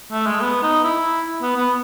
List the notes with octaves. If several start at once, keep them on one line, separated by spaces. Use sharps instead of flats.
A3
G#3
B3
D#4
E4
B3
B3